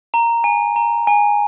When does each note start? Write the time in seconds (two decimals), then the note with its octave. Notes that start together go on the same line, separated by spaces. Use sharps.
0.14 A#5
0.44 G#5
0.76 A#5
1.07 G#5